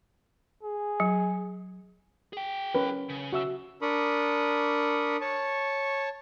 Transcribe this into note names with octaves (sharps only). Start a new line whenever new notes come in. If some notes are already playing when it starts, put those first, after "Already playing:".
G#4
F#3
G#4 G5
C#4 A#4 B4
C#3
F#4 E5 E6
D4 A#4 B5 C#6 D#6
C#5 A5 C#6